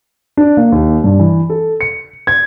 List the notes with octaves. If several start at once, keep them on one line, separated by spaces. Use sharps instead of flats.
D4
A#3
D#2
G2
E3
A4
C#7
G#6